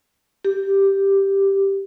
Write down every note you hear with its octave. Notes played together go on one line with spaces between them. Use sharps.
G4